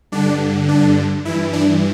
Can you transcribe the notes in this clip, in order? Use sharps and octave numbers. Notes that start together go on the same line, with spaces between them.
G2 D3 D4
D4
G2 E3 E4
D4